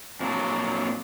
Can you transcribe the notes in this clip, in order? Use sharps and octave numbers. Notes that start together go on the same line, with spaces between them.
F2 A#2 F#3 D4